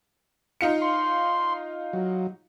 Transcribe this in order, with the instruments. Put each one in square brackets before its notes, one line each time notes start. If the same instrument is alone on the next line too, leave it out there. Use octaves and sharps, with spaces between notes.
[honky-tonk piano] D#4 F4 C#7
[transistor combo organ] C6
F#3